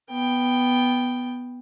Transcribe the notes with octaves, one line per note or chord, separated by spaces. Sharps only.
B3 G5